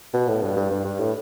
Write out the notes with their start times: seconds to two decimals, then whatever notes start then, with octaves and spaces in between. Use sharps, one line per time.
0.14 B2
0.28 A2
0.42 G2
0.57 G2
0.71 G2
0.85 G2
0.99 A2